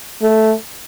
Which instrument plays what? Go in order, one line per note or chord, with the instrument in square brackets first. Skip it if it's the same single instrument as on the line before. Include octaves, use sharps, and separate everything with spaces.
[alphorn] A3